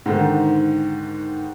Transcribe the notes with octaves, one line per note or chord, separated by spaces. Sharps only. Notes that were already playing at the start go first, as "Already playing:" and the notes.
G#2 D3 D#3